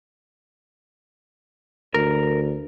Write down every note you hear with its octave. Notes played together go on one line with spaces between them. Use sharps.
D2 A#4